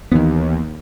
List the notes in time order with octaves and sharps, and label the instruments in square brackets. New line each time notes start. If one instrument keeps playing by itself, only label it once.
[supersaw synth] D#2 [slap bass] E3 B3